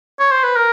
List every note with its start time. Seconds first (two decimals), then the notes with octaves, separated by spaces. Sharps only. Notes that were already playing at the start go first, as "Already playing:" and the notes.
0.20 C#5
0.32 C5
0.44 B4
0.56 A#4